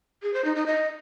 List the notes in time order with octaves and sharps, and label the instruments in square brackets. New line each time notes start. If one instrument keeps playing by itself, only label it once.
[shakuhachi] G#4
C5
D#4
D#4
D#5